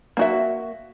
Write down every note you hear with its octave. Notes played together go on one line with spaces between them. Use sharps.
A#3 F#4 E5